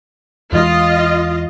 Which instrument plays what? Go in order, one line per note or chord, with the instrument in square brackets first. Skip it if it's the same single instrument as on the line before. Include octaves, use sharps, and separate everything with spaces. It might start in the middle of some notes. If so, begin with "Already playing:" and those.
[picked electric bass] E2 E3 G#3 [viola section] F4 D#5